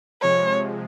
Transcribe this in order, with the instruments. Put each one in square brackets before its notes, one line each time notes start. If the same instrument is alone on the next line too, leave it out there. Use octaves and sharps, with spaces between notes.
[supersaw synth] C3 F3 G#3 [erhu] C#5